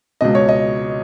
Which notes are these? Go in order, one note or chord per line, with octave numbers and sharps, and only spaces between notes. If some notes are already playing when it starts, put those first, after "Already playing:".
C#2 B2 D#5
C#5
D#5